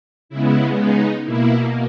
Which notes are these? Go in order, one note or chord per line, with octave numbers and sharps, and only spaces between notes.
C#3 G#3 B3 E4
D#4
B2 A#3 E4